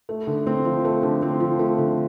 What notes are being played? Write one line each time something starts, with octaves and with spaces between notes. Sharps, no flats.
A3
D3
C4
F3
A3
D3
C4
F3
A3
D3